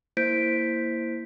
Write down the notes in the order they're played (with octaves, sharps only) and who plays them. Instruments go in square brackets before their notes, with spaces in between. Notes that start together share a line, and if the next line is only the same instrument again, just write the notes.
[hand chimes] A#3 E4 C5 G6 B6 D7